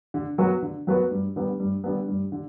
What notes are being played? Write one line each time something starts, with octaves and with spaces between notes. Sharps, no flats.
D3
F#3 B3 F#4 B4
D3
F#3 B3 F#4 B4
G2
D3 G3 B3
G2
D3 G3 B3
G2
D3